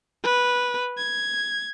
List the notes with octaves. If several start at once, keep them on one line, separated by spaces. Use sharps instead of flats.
B4
G#6